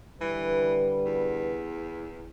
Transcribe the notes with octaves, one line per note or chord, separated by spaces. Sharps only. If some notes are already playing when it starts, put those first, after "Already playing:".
D3 E3 G3 B4
E2